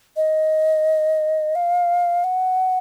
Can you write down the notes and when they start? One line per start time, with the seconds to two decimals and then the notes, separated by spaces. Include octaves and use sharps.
0.16 D#5
1.55 F5
2.24 F#5